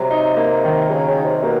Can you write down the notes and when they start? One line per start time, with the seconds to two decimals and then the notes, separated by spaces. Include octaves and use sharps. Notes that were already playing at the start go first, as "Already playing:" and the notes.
Already playing: C3 F#3
0.10 D#4
0.37 A#3
0.64 D#3
0.90 C#3 F#3
1.08 C#3
1.17 D#4
1.25 C3
1.43 B2 A#3